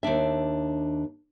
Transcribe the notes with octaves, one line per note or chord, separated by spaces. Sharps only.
D#2 B2 D4 E5